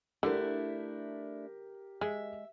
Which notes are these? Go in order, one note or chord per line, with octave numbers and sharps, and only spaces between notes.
D3 A3 D4 E4 G4 A#4
G#3 E5